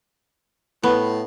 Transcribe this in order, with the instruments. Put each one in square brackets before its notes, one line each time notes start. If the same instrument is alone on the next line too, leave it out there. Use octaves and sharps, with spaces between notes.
[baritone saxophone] A2 [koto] B3